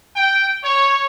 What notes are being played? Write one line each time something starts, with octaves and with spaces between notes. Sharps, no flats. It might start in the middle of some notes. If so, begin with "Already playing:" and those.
G5
C#5